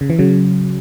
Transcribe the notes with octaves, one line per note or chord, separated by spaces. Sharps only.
C#3
E3
C#3 F#3